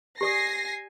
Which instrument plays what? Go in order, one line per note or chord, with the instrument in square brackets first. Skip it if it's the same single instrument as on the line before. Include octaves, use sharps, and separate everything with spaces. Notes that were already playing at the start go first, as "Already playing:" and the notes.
[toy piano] G4 D5 D#6 [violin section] G#5 A#6 C7